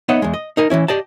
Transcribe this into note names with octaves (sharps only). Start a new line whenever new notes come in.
B3 D#4 C#5 D#5 E5 F#5
E2 G#3
D#5
D#4 A#4 G#5
E3 F#3 C#4 E4
G4 D5 D#5 A5